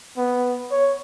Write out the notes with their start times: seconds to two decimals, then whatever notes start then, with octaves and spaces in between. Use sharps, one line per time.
0.17 B3
0.72 C#5